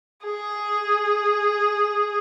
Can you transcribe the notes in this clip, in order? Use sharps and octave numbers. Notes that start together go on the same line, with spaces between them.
G#4